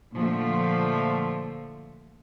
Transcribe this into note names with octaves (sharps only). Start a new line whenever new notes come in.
A#2 D3 F3 A3